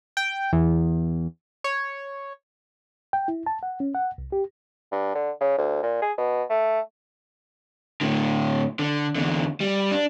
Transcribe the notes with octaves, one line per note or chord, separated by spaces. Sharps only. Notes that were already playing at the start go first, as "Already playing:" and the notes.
G5
E2
C#5
G5
E4
A5
F#5
C#4
F#5
C2
G4
G2
D3
C#3
D2
A#2
G#4
B2
A3
A2 D3
D3
E2 D3
G3
D4